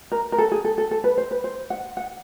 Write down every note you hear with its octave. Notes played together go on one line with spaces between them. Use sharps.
A#4
A#4
A4
G#4
A4
A4
A4
B4
C5
B4
C5
F#5
F#5